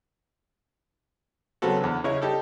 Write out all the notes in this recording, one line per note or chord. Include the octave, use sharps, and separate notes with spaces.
C#3 F#3 B3 C4 F#4 A4
E2 D3
C#3 D#4 E4 C#5
G3 D#4 G4 A4